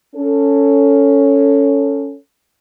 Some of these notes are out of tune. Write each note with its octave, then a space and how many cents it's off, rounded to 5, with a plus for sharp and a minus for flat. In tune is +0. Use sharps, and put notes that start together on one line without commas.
C#4 +5 A4 +15